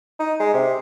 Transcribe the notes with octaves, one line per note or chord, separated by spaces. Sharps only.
D#4
G#3
C3